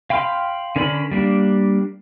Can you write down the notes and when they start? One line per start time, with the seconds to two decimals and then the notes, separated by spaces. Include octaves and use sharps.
0.10 F5 G5 B5 C6 F6
0.76 D3 C#4 A#4 D5 B5
1.11 G3 A#3 D4